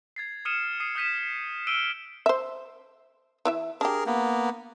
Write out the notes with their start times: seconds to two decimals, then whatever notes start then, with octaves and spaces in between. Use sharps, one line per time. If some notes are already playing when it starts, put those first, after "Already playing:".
0.16 G#6 A6 C7
0.45 D#6 F6 C#7 D#7 E7
0.80 D#6 C7 D#7
0.95 D#6 F6 G6 B6 D#7 E7
1.18 B6
1.67 E6 F6 D7 D#7 G7
2.26 C5 E5
3.45 E3 E4 E5
3.81 D4 G4 G#4 A#4
4.06 A#3 B3